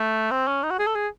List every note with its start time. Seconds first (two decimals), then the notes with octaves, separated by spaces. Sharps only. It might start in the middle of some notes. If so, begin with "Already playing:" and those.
Already playing: A3
0.31 C4
0.47 C#4
0.63 D#4
0.70 F#4
0.79 G#4
0.86 A4
0.95 G#4